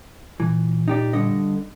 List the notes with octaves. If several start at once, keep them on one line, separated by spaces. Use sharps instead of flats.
A#2 E3
D#4 G4 D5
G2 D3 D#5